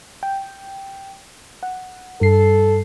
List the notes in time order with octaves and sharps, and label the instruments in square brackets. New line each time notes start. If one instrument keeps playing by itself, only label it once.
[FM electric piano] G5
F#5
[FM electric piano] G2 C7 [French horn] A4